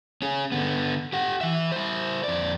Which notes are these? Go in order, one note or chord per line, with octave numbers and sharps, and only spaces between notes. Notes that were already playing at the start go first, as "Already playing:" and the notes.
C#4 G#4
D3 B3
G4 F#5
E3 E5
E4 C5
F2 D5